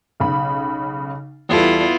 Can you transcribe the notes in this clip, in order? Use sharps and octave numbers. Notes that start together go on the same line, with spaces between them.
B1 C#3 B5
E2 G3 B3 E4 F4 A4